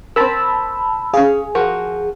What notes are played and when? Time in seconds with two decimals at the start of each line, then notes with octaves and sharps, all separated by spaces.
0.16 C4 A#4 A5 B5 E6
1.14 C#4 G#4 F5
1.55 F3 F#4 A#4